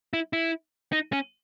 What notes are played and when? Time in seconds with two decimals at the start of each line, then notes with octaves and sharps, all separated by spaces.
0.13 E4
0.33 E4
0.92 D#4
1.12 C#4